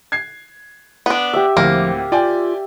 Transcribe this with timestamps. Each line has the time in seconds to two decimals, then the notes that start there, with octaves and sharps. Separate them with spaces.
0.12 G#6 C7
1.06 B3 D4
1.33 G4 E5
1.57 D2 A2 F3 A#3 C4
2.12 F4 D5 G5 G#5